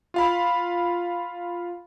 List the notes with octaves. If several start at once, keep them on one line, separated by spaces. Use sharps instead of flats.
F4 F5 B5